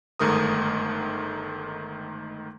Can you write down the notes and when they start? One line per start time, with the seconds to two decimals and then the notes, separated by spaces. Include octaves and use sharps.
0.19 G1 G#2 D#3 A3 A#4 D#6